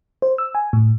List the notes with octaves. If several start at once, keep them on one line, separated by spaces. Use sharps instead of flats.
C5
E6
G#5
A2